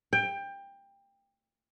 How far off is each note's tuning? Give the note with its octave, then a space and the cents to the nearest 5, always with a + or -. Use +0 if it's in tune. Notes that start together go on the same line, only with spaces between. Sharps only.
G5 +20